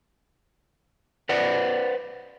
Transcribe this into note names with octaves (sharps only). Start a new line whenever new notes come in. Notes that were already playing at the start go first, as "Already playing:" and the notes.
B4 C5 D5 F#5